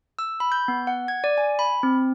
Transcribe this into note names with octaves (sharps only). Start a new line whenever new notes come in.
E6
B5
G6
B3
F#5
G#6
D5
G#5
B5
C4